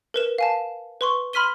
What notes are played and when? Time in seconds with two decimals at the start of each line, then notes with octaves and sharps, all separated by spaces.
0.14 A#4 B4 E7
0.38 F5 G#5 A5
1.01 B4 C6 C#6
1.33 B5 C6 F6 B6 D#7 G7